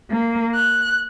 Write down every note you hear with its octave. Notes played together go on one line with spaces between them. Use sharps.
A#3
F#6